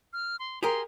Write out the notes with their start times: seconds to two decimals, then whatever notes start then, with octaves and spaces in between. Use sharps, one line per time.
0.13 F6
0.39 C6
0.63 G4 G#4 A#4 C6